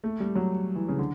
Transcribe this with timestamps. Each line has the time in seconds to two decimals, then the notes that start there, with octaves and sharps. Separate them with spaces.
0.04 A3
0.20 G3
0.35 F#3
0.75 E3
0.89 C#3
0.99 D3